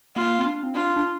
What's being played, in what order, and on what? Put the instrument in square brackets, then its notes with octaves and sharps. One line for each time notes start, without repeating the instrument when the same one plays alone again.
[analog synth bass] A#3 [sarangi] F4
[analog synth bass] C4
D4
C4
[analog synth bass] D4 [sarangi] F4
[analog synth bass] D4